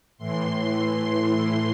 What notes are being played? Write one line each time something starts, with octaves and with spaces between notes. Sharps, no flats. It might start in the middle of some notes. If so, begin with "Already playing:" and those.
A2 E3 C6
C6
A2 E3